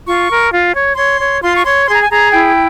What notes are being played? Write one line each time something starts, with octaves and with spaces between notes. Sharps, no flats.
F4 C#6
A#4
F4
C#5
C#5 C6
C#5
F4 C6
C#6
C#5 C6
G#4 C6
A#5
G#5
G#4 A#5
E4 G5